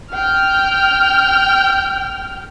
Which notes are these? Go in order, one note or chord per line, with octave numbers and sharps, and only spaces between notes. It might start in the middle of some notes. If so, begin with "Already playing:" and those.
G5 F6